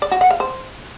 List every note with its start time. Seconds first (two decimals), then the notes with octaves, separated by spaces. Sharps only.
0.02 D5
0.11 F#4
0.21 F#5
0.31 F5
0.40 C5